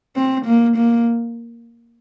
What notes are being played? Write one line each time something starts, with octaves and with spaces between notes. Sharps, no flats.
C4
A#3
A#3